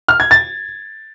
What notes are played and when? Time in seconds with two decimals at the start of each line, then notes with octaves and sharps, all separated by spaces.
0.08 F6
0.20 G#6
0.31 A6